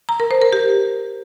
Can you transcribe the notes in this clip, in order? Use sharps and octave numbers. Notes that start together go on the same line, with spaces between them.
A#5
A#4
C5
A#4
G4